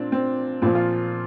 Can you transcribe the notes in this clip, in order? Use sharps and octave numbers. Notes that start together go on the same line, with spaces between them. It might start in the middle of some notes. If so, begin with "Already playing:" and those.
Already playing: A#2 C4 D4
C4
A#2 F3 C4
F4